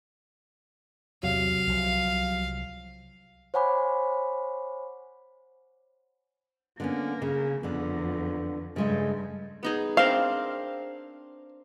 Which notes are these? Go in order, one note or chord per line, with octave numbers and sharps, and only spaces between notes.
B1 E2 C3 F#3 F5
C2 F3
C5 C#5 F#5 G#5 B5 D6
D3 A#3 B3 C#4
C#3
F2 D3 B3
G2 C#3 G#3 A3
B3 D#4 G#4
C4 D4 A#4 F5